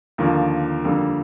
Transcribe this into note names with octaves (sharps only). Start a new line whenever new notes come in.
D#2 D3 F3 A#3
F2 D3 G3 A#3